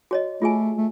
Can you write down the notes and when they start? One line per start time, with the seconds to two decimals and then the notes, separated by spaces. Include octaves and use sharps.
0.11 F#4 C#5 D#5
0.42 A3 F4 G#4 G#5
0.78 A3